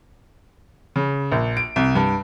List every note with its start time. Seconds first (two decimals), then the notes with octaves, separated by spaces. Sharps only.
0.96 C#3
1.32 A#1
1.57 D7
1.76 C2
1.95 G2